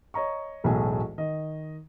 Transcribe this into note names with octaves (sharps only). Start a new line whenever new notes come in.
C#5 D#5 A#5 C#6
E1 B1 A2 A3 G#4 G#5
D#3 D#5